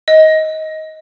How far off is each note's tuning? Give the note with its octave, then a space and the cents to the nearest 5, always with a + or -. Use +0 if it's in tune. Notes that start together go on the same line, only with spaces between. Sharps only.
D#5 +15